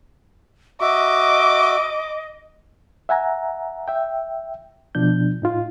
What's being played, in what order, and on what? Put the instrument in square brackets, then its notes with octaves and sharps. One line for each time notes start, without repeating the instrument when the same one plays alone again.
[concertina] F#4 E5 [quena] D#5 [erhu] D6
[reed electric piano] E5 F#5 G#5 A#5
E5 G5
B2 F3 D4 G6
A2 D#4 F4